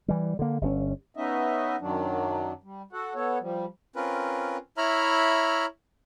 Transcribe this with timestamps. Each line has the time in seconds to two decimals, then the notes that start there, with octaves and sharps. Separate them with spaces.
0.08 E3 G3
0.39 D3 A#3
0.61 G1 C#3 C#4
1.17 B3 C#4 D#4 D#5 E5
1.80 F#2 D#3 F#3 D4
2.63 G3
2.92 F#4 A4 F#5
3.15 B3 A4 C#5
3.41 F3 G3
3.96 C4 C#4 F4 A#4 B4
4.77 E4 C#5 E5 A#5 B5 F6